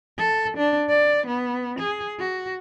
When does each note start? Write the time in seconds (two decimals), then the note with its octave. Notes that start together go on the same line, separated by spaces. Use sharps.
0.18 A4
0.57 D4
0.89 D5
1.27 B3
1.79 G#4
2.20 F#4